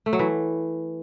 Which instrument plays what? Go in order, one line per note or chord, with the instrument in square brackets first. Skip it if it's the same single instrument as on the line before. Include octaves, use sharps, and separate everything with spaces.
[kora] A3
F#3
E3